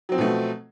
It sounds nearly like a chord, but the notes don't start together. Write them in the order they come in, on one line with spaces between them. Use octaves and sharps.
F#3 C4 F3 B2 A3